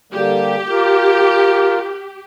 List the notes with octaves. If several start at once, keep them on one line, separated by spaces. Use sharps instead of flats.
D3 G3 A#3 G4
F4 A#4